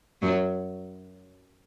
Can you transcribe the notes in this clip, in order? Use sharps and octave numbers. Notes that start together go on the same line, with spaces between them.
F#2 F#3